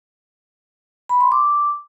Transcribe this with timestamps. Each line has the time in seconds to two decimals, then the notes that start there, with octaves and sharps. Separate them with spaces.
1.09 B5
1.21 C6
1.32 D6